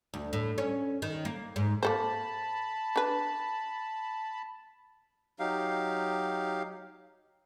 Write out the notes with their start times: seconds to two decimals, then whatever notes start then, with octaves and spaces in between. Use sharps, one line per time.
0.14 D2
0.33 A2
0.58 C#4
1.02 D#3
1.25 A#3
1.56 G#2
1.83 A#3 A4 C5 A5 B5
2.96 D4 B4
5.39 F#3 D#4 G4 F5